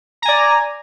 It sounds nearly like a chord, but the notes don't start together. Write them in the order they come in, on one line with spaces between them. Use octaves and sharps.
A#5 G#5 D5